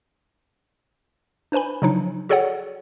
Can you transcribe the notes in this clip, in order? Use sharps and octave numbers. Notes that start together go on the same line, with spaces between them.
D4 B4 C5 G#5 B5
C#3 F3 F#3 D4 D#4
F#4 G#4 A4 C#5 D5 F#5